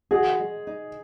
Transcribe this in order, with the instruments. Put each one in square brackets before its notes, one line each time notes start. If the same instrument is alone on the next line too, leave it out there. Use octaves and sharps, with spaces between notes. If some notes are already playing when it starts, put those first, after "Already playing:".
[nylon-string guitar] F#4 [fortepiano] G#4
[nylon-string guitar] G#3
D#4